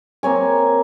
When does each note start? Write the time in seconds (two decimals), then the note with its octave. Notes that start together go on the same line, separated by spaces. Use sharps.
0.23 A#3 C4 C#5 G#5